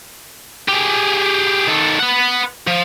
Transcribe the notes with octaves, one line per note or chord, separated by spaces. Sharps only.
G4 G#4
D#3 A4
B4 F#5
F3